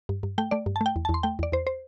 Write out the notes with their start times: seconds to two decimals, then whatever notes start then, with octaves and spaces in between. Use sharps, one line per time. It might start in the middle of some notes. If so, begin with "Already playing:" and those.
0.09 G2
0.23 G2
0.38 A3 G5
0.51 A3 D5
0.66 G2
0.76 A5
0.81 A3
0.86 G5
0.96 E2
1.05 A5
1.09 E2
1.14 C6
1.23 A3 G5
1.39 E2 D5
1.52 E2 C5
1.67 C5